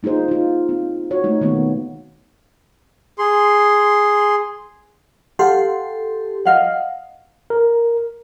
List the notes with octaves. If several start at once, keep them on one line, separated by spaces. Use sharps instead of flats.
A#3 D#4 F4 G#4 C5
D#4 F4
C4
F#4 C#5
A3 D#4
B2 D#3 A#3 B3
G#4 C6
G4 A4 F5 F#5 C6
D#5 F5 F#5
A#4